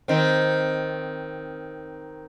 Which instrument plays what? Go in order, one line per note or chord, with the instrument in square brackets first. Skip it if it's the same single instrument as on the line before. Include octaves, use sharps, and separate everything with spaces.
[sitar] D#3 C4